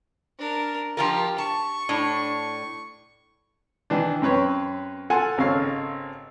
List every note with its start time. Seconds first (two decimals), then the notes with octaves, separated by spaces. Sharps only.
0.39 D4 A#4
0.97 F3 F4 G4 A#4
1.38 A5 C#6
1.89 A2 D4
3.90 D#3 E3 D4
4.22 F#2 C4 B4 C#5
5.10 F4 A4 F#5 G#5
5.38 G#1 C#3 A4 C#5 F5